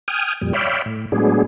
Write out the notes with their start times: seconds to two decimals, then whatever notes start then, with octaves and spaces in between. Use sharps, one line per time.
0.08 G5 G#5 D#6 F6
0.42 F2 A#2 G3
0.53 C#5 D5 E5 F5 G5 B5
0.86 A2
1.12 A2 F#3 G#3 B3 D4 G#4